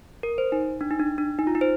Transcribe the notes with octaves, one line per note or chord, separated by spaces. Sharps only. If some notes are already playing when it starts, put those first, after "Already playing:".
A#4
C5
D#4
D4
D#4
D4
D4
D#4
F4
D#4
C5